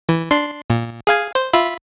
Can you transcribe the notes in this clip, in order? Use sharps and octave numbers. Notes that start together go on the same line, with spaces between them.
E3
D4 C6
A#2
G#4 F5 G#5
C5
F4 E5 B5